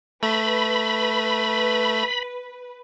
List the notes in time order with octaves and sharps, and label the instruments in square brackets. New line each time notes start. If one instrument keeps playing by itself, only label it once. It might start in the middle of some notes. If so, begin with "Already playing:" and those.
[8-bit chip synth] A3 [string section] B4 [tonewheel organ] B5